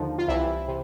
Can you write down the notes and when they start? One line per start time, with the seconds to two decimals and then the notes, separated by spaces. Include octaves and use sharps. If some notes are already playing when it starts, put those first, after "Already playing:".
Already playing: D#2 D3 F3 D#4
0.18 F4
0.28 C2 C3 E3 E4
0.68 C3